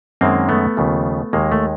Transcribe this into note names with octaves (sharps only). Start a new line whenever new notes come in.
F#2 D#3 G#3 A#3 C4
A3 B3
D#2 C#3 F3
D#2 D#3 G#3 A#3
A3